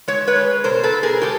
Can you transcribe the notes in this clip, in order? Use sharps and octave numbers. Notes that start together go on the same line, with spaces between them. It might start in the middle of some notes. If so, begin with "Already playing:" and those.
G#3 C#5
B4 C#5
G#3
B2 A#4 C5
A4 B4
B2
G#4 A#4
G#3 G4 A4